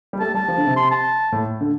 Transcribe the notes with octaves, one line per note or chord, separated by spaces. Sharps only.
G3
A3 A5
G3 A5
F3
D3
C3
C6
A5
A2
D3